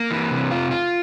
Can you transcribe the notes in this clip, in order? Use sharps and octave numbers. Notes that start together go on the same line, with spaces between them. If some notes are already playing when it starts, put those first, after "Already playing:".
Already playing: A#3
E3
C3
F4
F4